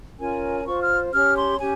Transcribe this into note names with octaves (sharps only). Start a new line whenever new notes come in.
C#4 F4 A#4 C#5 G#5
F4 C5 C#6
F6
C#4 G4 C#5 F6
C6
C#4 G4 G#5